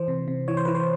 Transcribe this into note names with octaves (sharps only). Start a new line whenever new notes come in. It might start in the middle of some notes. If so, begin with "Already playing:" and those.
Already playing: E3 C5
C3
C3
E3 C#5
C5
E3 B4
C5